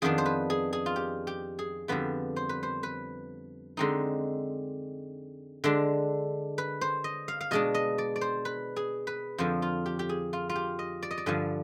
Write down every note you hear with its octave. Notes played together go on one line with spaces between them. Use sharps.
F2 D#3 B3 D4 G#4
C5
B4
G#4
G#4
F4
G4
G4
G#4
F2 D3 G3 B3 B4
C5
B4
C5
B4
D3 G#3 C4 D#4
D3 G#3 D4
B4
C5
D#5
F5
F5
B2 G#3 D4 D#5
D#5
D5
D5
C5
B4
G#4
B4
F2 D3 F3 C5
F4
G4
G4
G#4
F4
F4
G4
D#5
D5
D#5
D5
G2 D3 F3 G#5